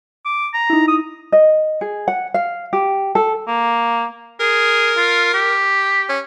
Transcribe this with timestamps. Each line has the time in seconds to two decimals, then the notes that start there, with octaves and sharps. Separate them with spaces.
0.25 D6
0.54 A#5
0.70 D#4 E4
0.88 D#6
1.32 D#5
1.81 G#4
2.08 F#5
2.34 F5
2.73 G4
3.15 A4
3.47 A#3
4.40 G#4 A#4
4.97 F4
5.34 G4
6.09 C#4